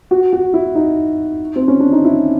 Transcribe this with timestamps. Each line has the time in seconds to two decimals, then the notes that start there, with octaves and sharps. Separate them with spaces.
0.11 F#4
0.33 F#4
0.54 E4
0.75 D#4
1.56 C4
1.68 C#4
1.80 D4
1.92 D#4
2.05 E4